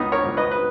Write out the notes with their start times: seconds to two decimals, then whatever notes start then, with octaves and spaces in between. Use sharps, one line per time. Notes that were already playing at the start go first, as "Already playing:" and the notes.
Already playing: C#2 B3 D#4
0.12 A#4 C#5
0.25 C#2
0.37 B4 D#5
0.51 B4